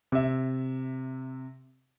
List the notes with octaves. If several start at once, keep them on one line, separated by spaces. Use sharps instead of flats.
C3 E5